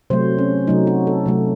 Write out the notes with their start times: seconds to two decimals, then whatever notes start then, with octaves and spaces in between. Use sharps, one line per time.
0.10 C3 F#3 A3 C5
0.39 C#4
0.67 C3 F#3 A3 D#4
0.87 F#4
1.07 A4
1.26 C3 F#3 A3